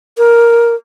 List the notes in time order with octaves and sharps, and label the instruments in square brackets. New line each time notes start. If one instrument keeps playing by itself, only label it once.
[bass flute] A#4